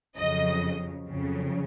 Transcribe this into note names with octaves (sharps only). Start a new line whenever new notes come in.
F2 C#3 F#3 D#5
F2 C#3 F#3